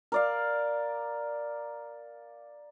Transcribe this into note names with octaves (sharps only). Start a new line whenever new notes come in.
A#4 D5 F5